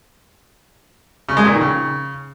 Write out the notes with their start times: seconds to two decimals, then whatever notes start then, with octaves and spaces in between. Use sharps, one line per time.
1.29 C#3
1.37 G#3
1.45 A#2
1.53 D#3
1.61 C#3